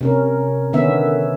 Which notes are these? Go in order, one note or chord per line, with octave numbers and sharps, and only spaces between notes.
C3 C#4 A#4
D3 D#3 B3 C#4 E5